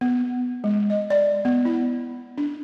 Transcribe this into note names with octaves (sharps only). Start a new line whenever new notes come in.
B3
G#3
D#5
D5
B3
E4
D4